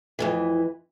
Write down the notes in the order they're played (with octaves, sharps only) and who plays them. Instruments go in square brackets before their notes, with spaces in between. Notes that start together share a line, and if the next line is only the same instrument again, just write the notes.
[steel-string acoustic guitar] F2 G#2 E3